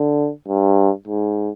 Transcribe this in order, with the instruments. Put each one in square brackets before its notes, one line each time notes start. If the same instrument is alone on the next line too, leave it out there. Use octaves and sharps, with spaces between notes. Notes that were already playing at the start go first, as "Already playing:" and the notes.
Already playing: [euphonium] D3
G2
G#2